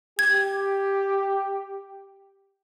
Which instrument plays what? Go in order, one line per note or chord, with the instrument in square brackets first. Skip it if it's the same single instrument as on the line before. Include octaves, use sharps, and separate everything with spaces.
[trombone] G4 [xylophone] G#6